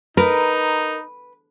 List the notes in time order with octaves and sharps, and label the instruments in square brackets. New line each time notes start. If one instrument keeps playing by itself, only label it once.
[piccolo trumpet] D#4 [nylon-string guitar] A#4 [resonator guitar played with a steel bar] B4